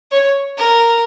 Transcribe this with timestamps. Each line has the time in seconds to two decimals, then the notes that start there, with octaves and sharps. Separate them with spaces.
0.12 C#5
0.58 A#4